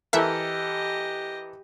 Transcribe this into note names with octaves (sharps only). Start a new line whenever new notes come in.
E3 G4 A4 A#4 D#5 E5